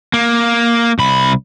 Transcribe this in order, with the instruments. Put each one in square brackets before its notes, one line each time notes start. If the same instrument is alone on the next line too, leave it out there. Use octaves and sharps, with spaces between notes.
[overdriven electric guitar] A#3
C2 B5